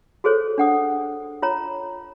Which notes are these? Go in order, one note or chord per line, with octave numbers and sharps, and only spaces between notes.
F#4 G#4 A4 C5 C#5
D4 F#5 D#6
F4 C#5 A#5